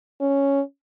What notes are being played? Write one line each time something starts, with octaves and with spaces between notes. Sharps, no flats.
C#4